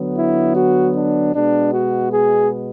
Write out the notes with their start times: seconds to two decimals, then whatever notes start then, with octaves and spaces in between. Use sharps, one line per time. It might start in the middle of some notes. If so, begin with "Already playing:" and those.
Already playing: D3 F#3 B3
0.17 E4
0.55 F#4
0.95 D4
1.33 B2 G#3 B3 D4
1.73 F#4
2.11 G#4